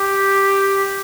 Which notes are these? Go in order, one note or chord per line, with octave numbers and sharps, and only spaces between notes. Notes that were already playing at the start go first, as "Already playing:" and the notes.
Already playing: G4